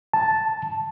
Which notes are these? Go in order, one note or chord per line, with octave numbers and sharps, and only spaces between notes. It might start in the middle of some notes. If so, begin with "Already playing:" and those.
A5